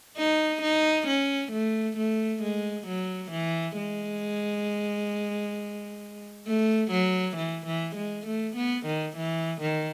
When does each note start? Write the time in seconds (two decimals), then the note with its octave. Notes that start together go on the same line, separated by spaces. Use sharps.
0.17 D#4
0.62 D#4
1.07 C#4
1.52 A3
1.97 A3
2.43 G#3
2.87 F#3
3.32 E3
3.77 G#3
6.47 A3
6.92 F#3
7.37 E3
7.66 E3
7.96 G#3
8.27 A3
8.56 B3
8.86 D#3
9.17 E3
9.61 D#3